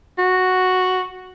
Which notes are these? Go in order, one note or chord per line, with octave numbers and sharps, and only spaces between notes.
F#4